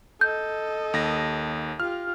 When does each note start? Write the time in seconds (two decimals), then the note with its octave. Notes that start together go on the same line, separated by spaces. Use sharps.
0.21 A4 D#5 G6
0.94 D#2 A#6
1.80 F4 G4 F6